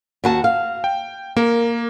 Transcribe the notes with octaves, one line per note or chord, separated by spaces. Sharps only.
D#2 F#4 A5
F5
G5
A#3 A#4